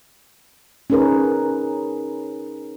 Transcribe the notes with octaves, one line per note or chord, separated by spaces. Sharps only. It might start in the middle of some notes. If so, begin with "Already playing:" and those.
C#4 D#4 G#4 A#4 B4